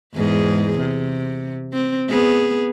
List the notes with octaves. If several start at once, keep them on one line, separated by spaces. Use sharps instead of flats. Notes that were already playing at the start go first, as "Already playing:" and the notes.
E2 G#2 G#4
C3
C4
B3 G#4